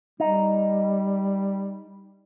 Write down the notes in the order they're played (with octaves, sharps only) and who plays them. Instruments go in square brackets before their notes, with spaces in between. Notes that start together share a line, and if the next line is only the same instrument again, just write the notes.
[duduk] G3 [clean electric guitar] D#4